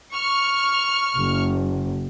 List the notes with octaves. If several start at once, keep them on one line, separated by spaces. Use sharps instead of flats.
C#6 F6
F#1